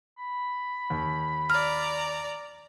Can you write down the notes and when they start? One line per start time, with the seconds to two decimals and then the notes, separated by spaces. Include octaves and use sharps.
0.17 B5
0.90 D#2
1.50 D5 A#5 F6